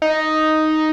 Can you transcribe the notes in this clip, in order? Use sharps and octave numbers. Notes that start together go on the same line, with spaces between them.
D#4